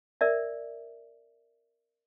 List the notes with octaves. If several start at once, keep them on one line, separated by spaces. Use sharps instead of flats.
A#4 D5 E5